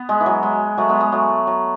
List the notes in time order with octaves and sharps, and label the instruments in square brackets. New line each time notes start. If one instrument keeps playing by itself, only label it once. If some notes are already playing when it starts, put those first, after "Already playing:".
Already playing: [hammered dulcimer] B3
G#3
E3
F#3
G#3
F#3 A3
G#3 B3
G#3 B3
F#3 A3
F#3